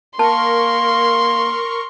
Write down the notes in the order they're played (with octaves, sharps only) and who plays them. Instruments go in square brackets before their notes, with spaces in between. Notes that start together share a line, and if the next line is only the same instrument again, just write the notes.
[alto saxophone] A#3 [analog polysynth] A#4 C#6 [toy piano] A5 [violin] C6